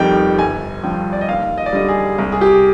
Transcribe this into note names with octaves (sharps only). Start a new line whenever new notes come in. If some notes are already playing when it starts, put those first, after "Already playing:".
Already playing: F1 F2 D#3 G3 G5
G1 G#5
G2 F3 G5
D5
D#5
D#2 F5
D#5
D5
D3 G3 D#5
G#4
C2
G#4
G4